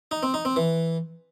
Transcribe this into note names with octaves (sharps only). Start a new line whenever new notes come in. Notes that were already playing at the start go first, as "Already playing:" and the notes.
D#4
C4
D#4
C4
E3